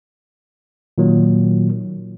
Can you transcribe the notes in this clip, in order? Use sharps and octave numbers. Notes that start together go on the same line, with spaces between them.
A#2 D#3 F#3